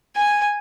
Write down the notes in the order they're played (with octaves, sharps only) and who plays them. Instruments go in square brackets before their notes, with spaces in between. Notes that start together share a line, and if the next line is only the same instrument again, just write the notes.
[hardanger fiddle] G#5